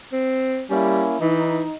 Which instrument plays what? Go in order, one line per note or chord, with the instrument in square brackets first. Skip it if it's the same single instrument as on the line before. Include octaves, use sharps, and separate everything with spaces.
[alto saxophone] C4
[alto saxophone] G3 [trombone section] A#3 C#4 E4
[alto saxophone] E3 [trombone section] D#4